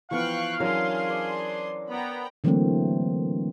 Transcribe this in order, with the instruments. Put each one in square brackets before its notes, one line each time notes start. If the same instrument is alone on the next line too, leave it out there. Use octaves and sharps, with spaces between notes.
[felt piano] E3 F3 B3 [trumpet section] F5 [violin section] G5 C#6 F#6
[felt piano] E3 F#3 C#4 [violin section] D4 G#4 C6 [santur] A#4 C#5
[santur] C5 D5
[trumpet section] B3 [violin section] G5 A#5 B5
[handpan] D3 E3 F#3 A3 A#3 C4